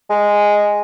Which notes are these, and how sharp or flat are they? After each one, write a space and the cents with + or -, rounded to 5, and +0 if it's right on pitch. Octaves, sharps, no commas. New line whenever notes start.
G#3 -5